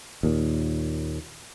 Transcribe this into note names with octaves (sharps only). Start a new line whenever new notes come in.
D#2 A#2